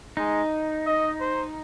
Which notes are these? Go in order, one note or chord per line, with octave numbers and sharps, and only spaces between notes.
G#3 D#4
D#5
C5